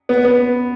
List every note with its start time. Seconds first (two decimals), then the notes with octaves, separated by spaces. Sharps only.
0.09 B3
0.25 B3